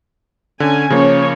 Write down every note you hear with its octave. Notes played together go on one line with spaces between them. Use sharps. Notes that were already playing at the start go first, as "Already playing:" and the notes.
D3 C#4 G#5
C#3 F3 A#3 C#4 C#5